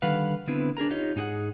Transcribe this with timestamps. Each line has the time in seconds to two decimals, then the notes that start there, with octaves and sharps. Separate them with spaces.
0.02 D3 D#3 G3 B4 F5 F#5
0.47 D3 B3 C4 D4 E4 B4
0.77 D4 G#4 A#4 A#5
0.91 D#4 F4 G4 C#5 D#5
1.16 G#2 D#4 G4 G#4 F#5